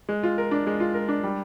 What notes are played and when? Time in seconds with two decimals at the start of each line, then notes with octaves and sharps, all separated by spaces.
0.09 G#3
0.23 F4
0.38 A#4
0.51 D4
0.67 G#3
0.80 F4
0.94 A#4
1.08 D4
1.23 G3